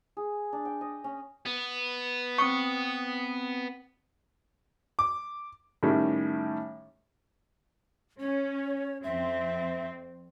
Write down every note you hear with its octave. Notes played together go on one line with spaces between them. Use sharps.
G#4
D4
G5
D#5
C#4
B3
C4 C#6 D#6 C#7
D6
A2 D#3 G3 C#4
C#4 C#5
F2 C4 E5